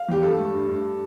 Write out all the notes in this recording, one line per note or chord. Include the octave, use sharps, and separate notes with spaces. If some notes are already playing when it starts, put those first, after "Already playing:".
Already playing: F5
E2 G4
G2 A4
A3
G2
G2